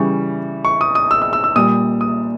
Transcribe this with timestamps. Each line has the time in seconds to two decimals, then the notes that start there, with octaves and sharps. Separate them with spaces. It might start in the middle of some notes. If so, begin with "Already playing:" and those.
Already playing: C#3 E3 G3 C#6
0.65 C#6
0.81 D#6
0.95 D#6
1.11 E6
1.22 E6
1.33 E6
1.44 E6
1.56 A#2 G3 D#6
2.01 D#6